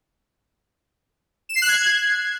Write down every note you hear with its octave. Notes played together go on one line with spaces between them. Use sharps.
E7
C7
F#6
G#6